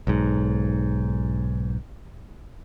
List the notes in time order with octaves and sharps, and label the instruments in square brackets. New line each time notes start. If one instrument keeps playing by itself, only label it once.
[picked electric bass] B1 G#2